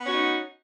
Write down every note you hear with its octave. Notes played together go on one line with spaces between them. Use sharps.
B3 C#4 D#4 F#4